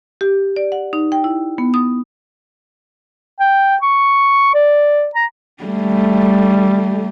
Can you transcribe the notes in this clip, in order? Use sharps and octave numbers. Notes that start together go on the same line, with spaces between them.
G4
D5
F#5
D#4
G5
E4
B3
D#6
G5
C#6
D5
A#5
G3 A3